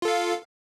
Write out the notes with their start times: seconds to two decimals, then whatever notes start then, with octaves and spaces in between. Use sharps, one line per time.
0.02 F4
0.05 A4
0.08 F5